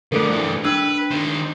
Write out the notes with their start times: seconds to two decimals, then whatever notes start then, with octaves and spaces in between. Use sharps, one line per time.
0.12 D3 F3 A3 A4 A#4
0.29 G2 E3
0.65 D4 B4 E6
1.11 D#3 C5